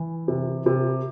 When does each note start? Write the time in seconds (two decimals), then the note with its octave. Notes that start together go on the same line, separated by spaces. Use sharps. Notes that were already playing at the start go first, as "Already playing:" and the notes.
Already playing: E3
0.28 C3
0.66 C3